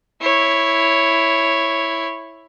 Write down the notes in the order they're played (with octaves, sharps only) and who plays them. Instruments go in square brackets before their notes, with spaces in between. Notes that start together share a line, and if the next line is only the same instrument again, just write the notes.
[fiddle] E4 C#5